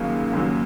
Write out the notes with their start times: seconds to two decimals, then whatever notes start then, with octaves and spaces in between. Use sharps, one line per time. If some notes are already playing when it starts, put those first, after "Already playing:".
Already playing: D#2 C#3 F#3 A#3
0.32 D#2 C#3 F#3 A#3